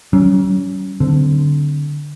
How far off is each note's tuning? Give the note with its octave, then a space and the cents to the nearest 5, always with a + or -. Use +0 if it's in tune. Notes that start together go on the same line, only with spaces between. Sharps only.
F#3 +40 C#4 +15
D3 +0 C4 -25